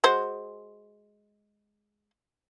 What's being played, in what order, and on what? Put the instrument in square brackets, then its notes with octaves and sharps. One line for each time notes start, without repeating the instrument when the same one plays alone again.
[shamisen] G#3 F#4 C5